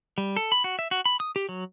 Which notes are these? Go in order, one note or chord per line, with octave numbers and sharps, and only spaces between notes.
G3
A4
B5
F#4
E5
F#4
B5
D#6
G4
F#3